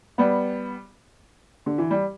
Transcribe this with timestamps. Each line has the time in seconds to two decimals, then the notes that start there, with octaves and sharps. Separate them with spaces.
0.18 G3 B3
1.66 D3
1.78 E3
1.91 G3